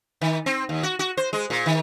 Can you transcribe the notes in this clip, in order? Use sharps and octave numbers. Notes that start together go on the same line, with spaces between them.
D#3
C4
D#2
F#4
F#4
C5
G#3
A#2
D#3